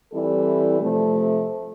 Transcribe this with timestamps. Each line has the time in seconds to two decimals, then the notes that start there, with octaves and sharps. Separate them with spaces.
0.12 E3 G3 C4 E4 A4
0.80 C3 F3 A3